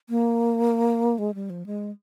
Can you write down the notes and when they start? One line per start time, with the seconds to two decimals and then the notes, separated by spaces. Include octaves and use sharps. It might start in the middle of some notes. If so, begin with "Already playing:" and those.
0.10 A#3
1.19 G#3
1.34 G3
1.50 F3
1.66 G#3